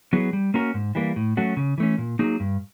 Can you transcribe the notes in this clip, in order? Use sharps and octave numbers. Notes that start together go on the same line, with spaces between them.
F#3 B3 E4 G#4
G3
A#3 C#4 F#4 A#4
G#2
E3 G3 A#3
A2
F#3 A3 C#4 F#4
C#3
E3 A3 C#4
A#2
F#3 A#3 D#4 G#4
G2